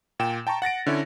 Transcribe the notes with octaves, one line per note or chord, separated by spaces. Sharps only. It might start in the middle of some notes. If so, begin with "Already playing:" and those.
A#2 G5 E7
G5 A5 A#5 C#6
F#5 A6 A#6 D7
D3 C#4 E4 C#5